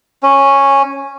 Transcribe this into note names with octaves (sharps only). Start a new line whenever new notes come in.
C#4